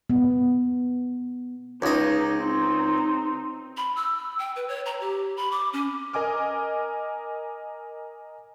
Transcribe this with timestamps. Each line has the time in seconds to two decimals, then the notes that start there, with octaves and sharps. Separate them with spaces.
0.10 B3
1.82 C#2 D#4 D#5
2.39 C4 D#4
3.77 B5
3.96 E6
4.39 G5
4.56 B4
4.69 C#5
4.86 A#5
5.01 G4
5.37 B5
5.51 D6
5.73 C#4
6.13 A#4 D#5 G#5 D6 F6